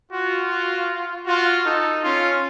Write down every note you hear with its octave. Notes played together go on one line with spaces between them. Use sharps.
F4 F#4
F#4
F4 F#4
D#4 A4
C#4 F4